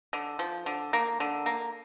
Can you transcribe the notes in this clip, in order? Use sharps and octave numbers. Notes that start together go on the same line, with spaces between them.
D3
F3
D3
A#3
D3
A#3